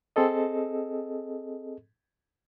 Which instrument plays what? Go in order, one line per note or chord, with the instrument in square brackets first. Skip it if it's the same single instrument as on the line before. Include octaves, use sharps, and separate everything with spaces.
[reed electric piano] C4 G#4 A4 D#5